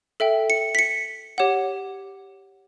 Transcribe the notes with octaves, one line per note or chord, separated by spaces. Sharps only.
A4 E5 G5
C#7
B6
C#7
G4 C#5 F#5